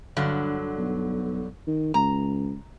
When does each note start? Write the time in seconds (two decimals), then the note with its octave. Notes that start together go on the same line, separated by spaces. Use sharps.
0.17 G2 D3 F#3
0.78 B1
1.67 D#3
1.94 C#2 A#5